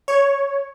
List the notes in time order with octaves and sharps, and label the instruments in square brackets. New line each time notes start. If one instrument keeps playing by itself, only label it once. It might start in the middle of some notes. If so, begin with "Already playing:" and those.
[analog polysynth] C#5